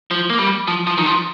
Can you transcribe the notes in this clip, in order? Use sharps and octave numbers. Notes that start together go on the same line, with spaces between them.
F3
A#3
G3
F3
F3
D#3
F3